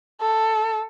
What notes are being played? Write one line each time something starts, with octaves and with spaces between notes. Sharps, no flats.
A4